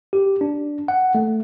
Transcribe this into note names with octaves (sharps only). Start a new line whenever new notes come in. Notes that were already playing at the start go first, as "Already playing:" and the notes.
G4
D4
F#5
A3